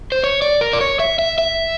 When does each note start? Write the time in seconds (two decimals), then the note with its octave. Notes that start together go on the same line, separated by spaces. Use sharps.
0.12 C5
0.24 C#5
0.42 D5
0.61 A#4
0.73 D5
0.81 C#5
1.00 E5
1.19 E5
1.38 E5